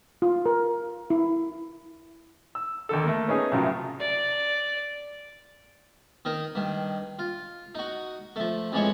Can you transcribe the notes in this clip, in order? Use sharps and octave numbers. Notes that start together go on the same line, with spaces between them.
F4
A#4
E4
E6
D#2 D3 A4
A3 A#3
B3 C#4 D#4 G#4
C2 F#2 A2 C#3 F#3 F4
D5
D#3 D#4 A#4
G2 D#3
F4
D#4 F#4
F3 A3
F2 E3 F3 G#3 C#5